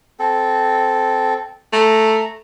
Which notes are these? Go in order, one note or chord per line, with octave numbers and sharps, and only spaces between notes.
C4 A4
A3 A#5